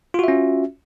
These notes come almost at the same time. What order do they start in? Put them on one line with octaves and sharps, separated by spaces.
F4 F#4 E5 C#4